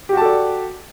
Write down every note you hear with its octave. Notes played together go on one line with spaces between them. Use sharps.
F#4 G4 A4 D5 A5